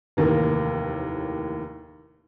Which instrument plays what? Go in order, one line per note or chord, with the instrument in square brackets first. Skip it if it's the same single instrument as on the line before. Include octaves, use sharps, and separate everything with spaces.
[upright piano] F1 D#2 A2 E3 A#3